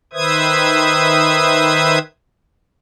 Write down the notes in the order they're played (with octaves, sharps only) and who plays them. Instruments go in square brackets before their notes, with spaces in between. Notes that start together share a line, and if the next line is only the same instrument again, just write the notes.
[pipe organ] D#3 B4 C5 E5 D#6 G#6